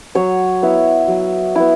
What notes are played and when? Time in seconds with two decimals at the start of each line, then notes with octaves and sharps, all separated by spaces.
0.15 F#3 C#5
0.63 B3 E4
1.08 F#3
1.55 B3 E4